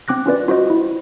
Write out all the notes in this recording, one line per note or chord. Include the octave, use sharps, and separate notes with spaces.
C4 D6 F#6 A#6
C#4 F4 B4 D5
F4 F#4 C5 D#5
E4